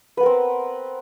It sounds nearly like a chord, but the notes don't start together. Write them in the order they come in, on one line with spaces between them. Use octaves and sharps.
B4 B3 A#4 C4